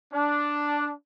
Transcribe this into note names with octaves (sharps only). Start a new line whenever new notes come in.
D4